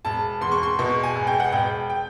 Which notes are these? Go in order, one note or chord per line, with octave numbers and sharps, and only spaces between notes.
E1 A5
E2 C6
C#6
C6
B2 C#6
G#5
E1
G5
F#5
E1 G5
G5